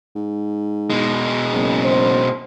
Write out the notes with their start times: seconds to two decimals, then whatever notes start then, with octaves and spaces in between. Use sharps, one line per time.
0.16 G#2
0.90 B2 G#3
1.53 F#1
1.83 C5